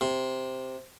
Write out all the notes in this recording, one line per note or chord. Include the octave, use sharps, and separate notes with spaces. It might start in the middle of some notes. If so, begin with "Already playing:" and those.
C3